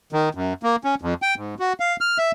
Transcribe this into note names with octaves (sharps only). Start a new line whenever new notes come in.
D#3
F#2
A#3
C#4
F2
G5
G#2
F#4
F5
F6
E5